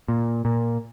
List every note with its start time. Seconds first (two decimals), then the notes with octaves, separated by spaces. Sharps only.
0.08 A#2
0.45 A#2